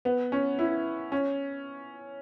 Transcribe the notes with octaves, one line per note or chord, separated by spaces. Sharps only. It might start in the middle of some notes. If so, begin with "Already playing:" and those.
B3
C#4
E4
C#4